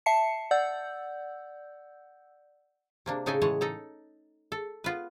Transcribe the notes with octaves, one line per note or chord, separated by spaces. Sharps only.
E5 A5 C7 C#7
D5 F#5 E6 G6
C3 A#3 D4
A2 C#3 D#4 A4 G5 G#5
A2 E3 G#3 C#5 D#5 A5
D#4 A4 A#5
A4
B3 F4 B4